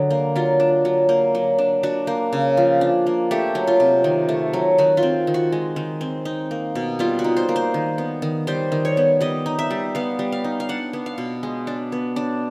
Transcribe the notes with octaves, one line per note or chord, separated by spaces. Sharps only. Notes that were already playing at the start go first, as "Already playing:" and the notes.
Already playing: D3 F#3 G#4
A#3
F#3 F4
D4
F#3
A#3
F#3
D4
D4 F#4
A#3
C#3
F3
D4
A#3
A3 G4
F#3
F4
C3
D#3
A3
F#3
D#3 F#4
F4
C4
D#3
F#4
G#3
D#3
C4
D#4
A#3
B2
G3 F4
F#4
D#4
C5
A#3
C5
D#3
B3
D#3
G3 C5
D#3
C#5
B3
G3 D#5
D#4
E5
G3
B3 F5
G3
F5
D#4
F5
D4 F#5
B3
F5
B2
G#3
D4
B3
D4